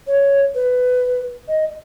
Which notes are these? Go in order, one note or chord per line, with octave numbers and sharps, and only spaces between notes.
C#5
B4
D#5